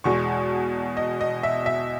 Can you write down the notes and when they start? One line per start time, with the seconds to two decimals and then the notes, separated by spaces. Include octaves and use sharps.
0.04 E2 B2 G#3 C#6
0.97 D#5
1.21 D#5
1.43 E5
1.66 E5